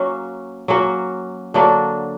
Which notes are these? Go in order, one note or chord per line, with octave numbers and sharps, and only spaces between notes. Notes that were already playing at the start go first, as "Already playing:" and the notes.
Already playing: F#3 A#3 C#4 F#4
F#3 A#3 C#4 F#4
D3 F#3 A#3 D4